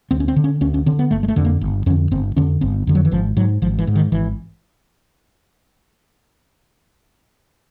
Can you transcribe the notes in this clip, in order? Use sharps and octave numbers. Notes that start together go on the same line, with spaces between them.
D2 C4
C#4
C4
D3
C#4
D2 C#4
C#4
D3 C4
B3
G1 A3
G#3
A3
F2 D3
A#3
G1
F2 D3 C#4
G1 C4
F2 D3 C#4
G1 C4
F2 D3
F#3
E3
G#1 F3
G#2 F#3
G#1 F3
E3
G#2
D#3
G#1 E3